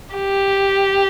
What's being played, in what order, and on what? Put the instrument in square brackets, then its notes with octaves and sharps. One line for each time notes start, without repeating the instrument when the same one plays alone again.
[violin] G4